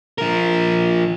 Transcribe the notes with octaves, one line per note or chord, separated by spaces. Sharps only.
F3 A#4